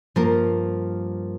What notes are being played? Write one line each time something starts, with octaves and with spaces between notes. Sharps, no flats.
G2 F3 A#3 A#4